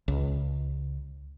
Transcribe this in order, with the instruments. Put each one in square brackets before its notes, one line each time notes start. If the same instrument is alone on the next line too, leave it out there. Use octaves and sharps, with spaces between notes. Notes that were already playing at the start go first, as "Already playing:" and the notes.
[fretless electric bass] C#2